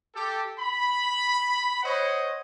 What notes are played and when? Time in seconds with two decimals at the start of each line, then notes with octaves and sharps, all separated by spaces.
0.13 G4 A4
0.58 B5
1.83 C5 C#5 D#5 F#5